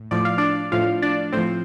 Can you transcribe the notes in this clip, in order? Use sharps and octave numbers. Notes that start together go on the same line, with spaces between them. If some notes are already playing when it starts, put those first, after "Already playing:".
Already playing: A2
A2 F3 D5
F5
D4 D5
A2 F3 F4 F5
D4 D5
A2 F3 C4 C5